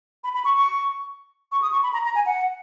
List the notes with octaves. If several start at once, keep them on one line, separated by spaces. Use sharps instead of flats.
B5
B5
C#6
C#6
C#6
D#6
C#6
B5
A#5
A#5
G#5
F#5